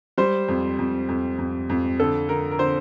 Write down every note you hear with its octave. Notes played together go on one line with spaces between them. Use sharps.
G3 C5
F2
F2
F2
F2
F2
D3 A4
D3 A#4
A#4
D3 C5